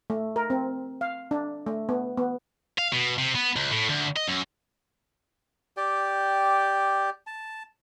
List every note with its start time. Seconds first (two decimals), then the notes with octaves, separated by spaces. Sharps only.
0.10 A3
0.36 A#4
0.50 C4
1.01 F5
1.31 D4
1.66 A3
1.89 B3
2.17 B3
2.78 F5
2.93 B2
3.18 C3
3.35 B3
3.56 C#2
3.71 A2
3.89 D2
4.16 D#5
4.28 F#2
5.77 G4 D5 G5
7.27 A5